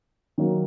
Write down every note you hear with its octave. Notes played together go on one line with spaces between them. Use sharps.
D#3 F#3 A#3